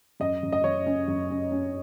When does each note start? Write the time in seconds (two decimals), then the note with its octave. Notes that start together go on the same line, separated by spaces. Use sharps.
0.20 F#2 D#5
0.43 F#2
0.52 D#5
0.64 F#2 C#5
0.86 C#4
1.08 F#2
1.31 C#4
1.52 C#4